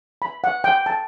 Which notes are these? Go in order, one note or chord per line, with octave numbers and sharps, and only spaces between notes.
B5
F#5
G5
A5